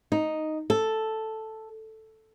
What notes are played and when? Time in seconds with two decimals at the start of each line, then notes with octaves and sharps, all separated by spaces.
0.12 D#4
0.70 A4